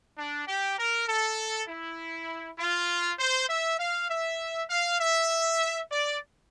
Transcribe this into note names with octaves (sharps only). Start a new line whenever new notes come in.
D4
G4
A#4
A4
E4
F4
C5
E5
F5
E5
F5
E5
D5